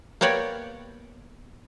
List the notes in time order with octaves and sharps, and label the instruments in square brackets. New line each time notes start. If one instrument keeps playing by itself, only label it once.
[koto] A#3 B3 G4 C#5 D5